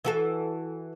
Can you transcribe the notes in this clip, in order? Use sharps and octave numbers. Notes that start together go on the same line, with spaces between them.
E3 F#4 A4